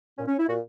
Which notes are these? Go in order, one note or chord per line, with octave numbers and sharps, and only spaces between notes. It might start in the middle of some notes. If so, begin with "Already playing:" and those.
A#2 C#4
C#4
E4
A#2 F#4